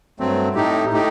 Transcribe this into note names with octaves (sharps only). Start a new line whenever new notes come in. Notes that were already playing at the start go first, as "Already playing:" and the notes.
G2 F#3 A3 C4
A2 A3 D#4 G4
A2 A3 D#4 G4